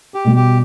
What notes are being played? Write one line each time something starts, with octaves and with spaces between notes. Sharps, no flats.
G4
B2 G3
G4